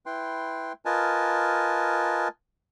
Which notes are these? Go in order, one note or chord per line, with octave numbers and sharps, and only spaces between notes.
E4 B4 G5 C6
F4 A#4 B4 D#5 G#5 A5